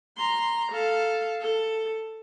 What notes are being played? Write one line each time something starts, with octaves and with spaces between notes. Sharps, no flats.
A#5 C6
A4 F5
A4